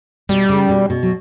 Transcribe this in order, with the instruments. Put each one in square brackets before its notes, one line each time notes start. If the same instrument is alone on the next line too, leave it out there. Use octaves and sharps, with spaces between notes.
[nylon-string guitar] B2 [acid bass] G3
[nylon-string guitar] C#3
B2
B2
F#3